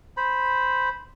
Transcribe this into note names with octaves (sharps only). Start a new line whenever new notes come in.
C5 B5